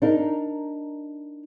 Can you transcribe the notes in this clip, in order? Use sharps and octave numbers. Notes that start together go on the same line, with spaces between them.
D4 D#4 A#4